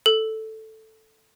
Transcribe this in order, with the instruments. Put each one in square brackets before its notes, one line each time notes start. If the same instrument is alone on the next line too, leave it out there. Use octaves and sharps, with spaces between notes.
[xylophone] A4